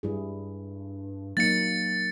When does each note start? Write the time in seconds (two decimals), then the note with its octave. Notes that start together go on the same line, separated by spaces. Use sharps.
0.03 G2 G3 E4 G#4
1.37 F#3 A#3 D#4 A6 C#7